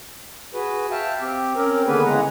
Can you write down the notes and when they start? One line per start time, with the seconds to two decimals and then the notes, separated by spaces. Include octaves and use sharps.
0.54 F#4 G#4 B4
0.91 E5 F5 G5 A5
1.21 C4 G4
1.56 C4 C#4 A#4
1.87 D3 D#3 A#3 B3 G#4 B4
2.05 C#3 E3 G#3 G#4 F#5 A#5